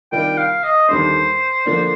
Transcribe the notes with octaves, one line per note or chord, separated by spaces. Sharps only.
C3 D#3 G3 D4 F4 G5
F5
D#5
D#2 D3 G3 D4 C5
D3 F3 A#3 D4